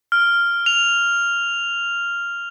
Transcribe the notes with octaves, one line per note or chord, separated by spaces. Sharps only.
F6
F7